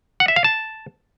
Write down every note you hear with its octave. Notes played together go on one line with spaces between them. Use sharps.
F#5
E5
F5
A5